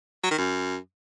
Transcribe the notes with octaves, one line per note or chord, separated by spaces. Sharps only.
F#3
D#3
F#2